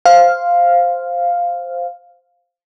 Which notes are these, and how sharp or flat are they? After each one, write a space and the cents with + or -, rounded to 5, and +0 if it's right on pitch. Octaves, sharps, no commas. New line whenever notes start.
C5 +0 F5 +0